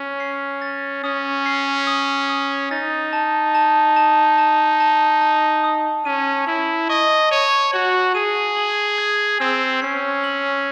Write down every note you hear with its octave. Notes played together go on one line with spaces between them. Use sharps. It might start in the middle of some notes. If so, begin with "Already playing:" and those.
Already playing: C#4
C7
A6
C#4 D#6
C7
D#6
D#6
D#4 A6
A5
A5
A5
A5
A5
A5
D#6
C#4 D#7
E4 F#7
D#5 C#6
C#5 D#7
F#4 F#7
G#4 D#7
F#7
G#6
C4 E6
C#4 C7
F#7